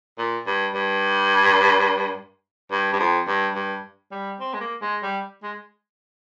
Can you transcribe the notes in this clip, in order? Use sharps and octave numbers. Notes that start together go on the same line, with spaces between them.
A#2
G2
G2
G2
G2
F2
G2
G2
G3
C4
G#3
A#3
G#3
G3
G#3